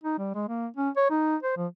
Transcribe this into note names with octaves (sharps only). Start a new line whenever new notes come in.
D#4
G3
G#3
A#3
C#4
C#5
D#4
C5
F3